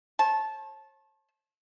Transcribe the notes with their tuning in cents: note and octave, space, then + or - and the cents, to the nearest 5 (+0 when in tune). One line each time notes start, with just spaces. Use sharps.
C#5 -45 A5 -15